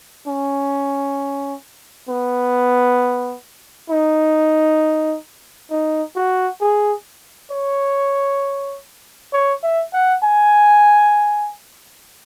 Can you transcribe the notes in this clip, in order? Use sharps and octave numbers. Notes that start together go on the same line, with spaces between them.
C#4
B3
D#4
D#4
F#4
G#4
C#5
C#5
E5
F#5
G#5